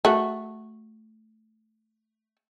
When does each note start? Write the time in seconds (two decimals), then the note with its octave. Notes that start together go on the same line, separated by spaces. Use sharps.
0.05 A3 F#4